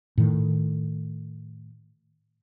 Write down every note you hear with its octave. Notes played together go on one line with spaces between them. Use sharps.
A2 D#3